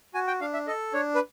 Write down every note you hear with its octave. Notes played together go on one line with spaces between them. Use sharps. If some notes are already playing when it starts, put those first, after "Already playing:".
F#4 G#5
G5
D4 F5
E5
A4 D#5
D4 C#5
B4